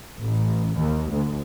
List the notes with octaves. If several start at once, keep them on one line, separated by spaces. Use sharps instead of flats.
A1
D#2
D2